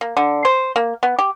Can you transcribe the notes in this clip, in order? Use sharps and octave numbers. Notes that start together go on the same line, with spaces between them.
A#3
D3
C5
A#3
B3
G4